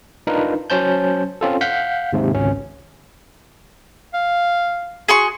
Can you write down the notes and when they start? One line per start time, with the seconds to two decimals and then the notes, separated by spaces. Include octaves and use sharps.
0.27 D4 D#4 F4 A#4 B4
0.70 F#3 C#4 C5 A5 G6
1.41 C4 C#4 F4 A4
1.61 F5 F#5 G6 B6
2.13 D#2 G#2 C3
2.34 G#1 C#2 C#4
4.14 F5
5.09 F#4 G#4 C6 C#6